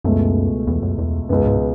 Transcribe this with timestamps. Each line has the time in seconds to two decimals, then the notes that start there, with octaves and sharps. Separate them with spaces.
0.04 C#2 F#2 B2 A3
0.67 E2
0.82 F#2
0.98 E2
1.29 C#2 F#2 B2 G#3 B3
1.46 G#2